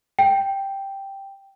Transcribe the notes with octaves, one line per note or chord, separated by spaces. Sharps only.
G5